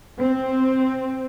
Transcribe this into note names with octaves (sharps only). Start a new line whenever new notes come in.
C4